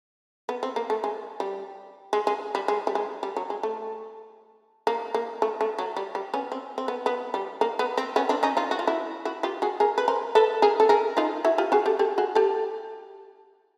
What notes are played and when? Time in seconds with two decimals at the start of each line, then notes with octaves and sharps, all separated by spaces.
0.49 B3
0.63 C4
0.76 A#3
0.90 A3
1.04 G#3
1.40 G3
2.13 G#3
2.27 G#3
2.55 G3
2.68 G#3
2.87 G3
2.95 G#3
3.23 G3
3.36 F#3
3.50 G#3
3.63 A3
4.87 A#3
5.14 A#3
5.42 A3
5.61 A3
5.78 F#3
5.96 G3
6.15 G3
6.34 B3 C#4
6.52 C4
6.78 C4
6.88 B3
7.06 B3
7.34 G3
7.61 A#3
7.79 B3
7.98 C4
8.16 B3 C#4
8.29 C4 D4
8.43 C#4 D#4
8.57 D#4 F4
8.71 F#4
8.79 F4
8.87 E4 F#4
9.25 E4 F#4
9.43 F4 G4
9.62 F#4 G#4
9.80 G#4 A#4
9.98 B4
10.08 A#4 C5
10.35 A4 B4
10.62 G#4 A#4
10.80 A4
10.89 G#4 A#4
11.17 D#4 F4
11.45 E4 F#4
11.58 F4 G4
11.72 F#4 G#4
11.86 G4 A4
11.99 G4 A4
12.18 F#4 G#4
12.35 G4 A4